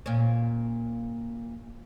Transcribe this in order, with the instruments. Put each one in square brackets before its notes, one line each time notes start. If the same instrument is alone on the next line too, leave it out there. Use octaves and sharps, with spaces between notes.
[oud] A#2 C#4